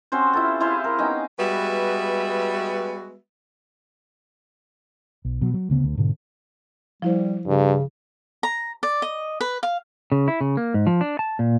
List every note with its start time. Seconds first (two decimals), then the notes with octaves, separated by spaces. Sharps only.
0.12 C4 C#4 F#4 C5
0.33 E4 F4 A4
0.60 E4 G#4 C5 F5
0.84 A#4
0.98 B3 C#4 D#4 G5
1.39 G3 G#3 B3 F#4 B4 E5
5.25 B1
5.41 B2 F#3
5.54 F#3
5.70 D2 C#3 B3
5.84 D2
5.97 G#2 B2 D3
7.02 F3 G3 E4 C5
7.47 G2 C#3
8.43 A#5
8.83 D5
9.02 D#5
9.41 B4
9.63 F5
10.12 C#3
10.28 E4
10.41 C#3
10.57 A#3
10.74 G#2
10.87 F3
11.01 D4
11.19 A5
11.39 A#2